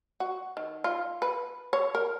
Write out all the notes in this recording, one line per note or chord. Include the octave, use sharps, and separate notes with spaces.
F#4
D#3
F4
B4
C#5
A#4